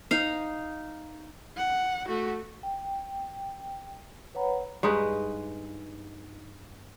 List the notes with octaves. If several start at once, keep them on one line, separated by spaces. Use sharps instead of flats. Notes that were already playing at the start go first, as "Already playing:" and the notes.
D#4 F5
F#5
A3 F#4
G5
B4 C#5 F#5 A#5 B5
G2 G#3 D#4 B4